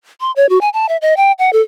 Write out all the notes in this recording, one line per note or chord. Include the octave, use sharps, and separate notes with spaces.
C6
C#5
F#4
G#5
A5
E5
D#5
G5
F#5
A4